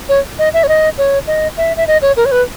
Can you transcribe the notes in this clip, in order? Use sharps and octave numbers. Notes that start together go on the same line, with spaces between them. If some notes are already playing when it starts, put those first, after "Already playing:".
C#5
D#5
E5
C#5
D#5
C#5
D#5
E5
E5
D#5
C#5
A#4
C#5
B4